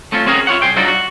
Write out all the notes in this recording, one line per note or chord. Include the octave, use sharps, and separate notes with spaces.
A3 C4 C#4 F4
C4 C#4 F#4 G#4 A#4
E4 F4 C#5 F#5
C2 G#4 C5 G5
F#3 G3 D4 D#4 F4 F#4
F#4